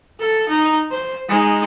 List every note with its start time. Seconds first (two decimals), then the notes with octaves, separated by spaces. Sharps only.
0.20 A4
0.49 D#4
0.91 C5
1.29 G#3 D#4